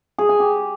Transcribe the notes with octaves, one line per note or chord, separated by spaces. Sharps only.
G#4
G#5
G4